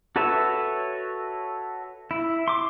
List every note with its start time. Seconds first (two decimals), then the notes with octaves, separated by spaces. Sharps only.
0.16 F#4 A4 B4 C#5 E5
2.11 E4
2.48 C6 D6